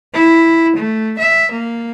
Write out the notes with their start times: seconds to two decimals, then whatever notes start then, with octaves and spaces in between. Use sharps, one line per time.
0.13 E4
0.76 A3
1.18 E5
1.52 A#3